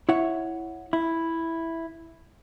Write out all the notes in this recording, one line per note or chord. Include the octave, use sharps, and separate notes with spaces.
E4 C#5 F#5
E4